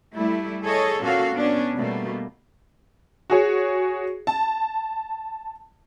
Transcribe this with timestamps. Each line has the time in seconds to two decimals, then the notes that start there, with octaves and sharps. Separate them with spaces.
0.14 G3 A3 E4
0.63 G#4 A4 C#5 D#5
1.01 A#2 A#3 C#4 F#4 A4 F5
1.32 B3 C#4 D4
1.74 B2 G3 A3 A#3
3.30 F#4 G#4 C#5
4.27 A5